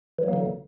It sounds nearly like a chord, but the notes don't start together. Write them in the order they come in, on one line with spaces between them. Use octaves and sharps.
E3 F#3 A#3 D3